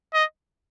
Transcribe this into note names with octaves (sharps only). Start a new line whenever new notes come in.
D#5